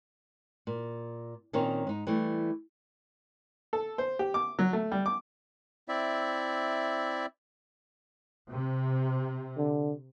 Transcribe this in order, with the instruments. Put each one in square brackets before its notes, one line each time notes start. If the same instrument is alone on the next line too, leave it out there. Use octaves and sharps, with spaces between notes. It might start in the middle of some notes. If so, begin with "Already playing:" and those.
[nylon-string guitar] A#2
A#2 D#3 C4 C#4 D#4
G#2 D#4
E3 G3 A3
[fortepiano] A4
C5
G4
D6
F#3
A3
G3
D6
[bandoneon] C4 E4 D5 E5
[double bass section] C3
[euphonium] D3